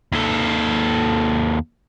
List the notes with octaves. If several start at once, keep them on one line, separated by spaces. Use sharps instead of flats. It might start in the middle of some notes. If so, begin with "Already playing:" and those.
D#2 A4